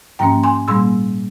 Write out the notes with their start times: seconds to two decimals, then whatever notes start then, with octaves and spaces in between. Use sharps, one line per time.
0.19 G#2 F3 A#3 C#4 G5 A#5
0.43 G#5 C6
0.68 A#2 G3 A#3 C6 E6